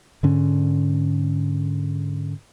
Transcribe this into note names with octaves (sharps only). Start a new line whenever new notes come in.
G#2 D3 C#4